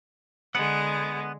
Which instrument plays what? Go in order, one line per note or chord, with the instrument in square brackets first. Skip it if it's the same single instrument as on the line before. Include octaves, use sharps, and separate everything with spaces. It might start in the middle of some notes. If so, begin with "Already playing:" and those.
[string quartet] D3 G#3 [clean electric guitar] B3 F#5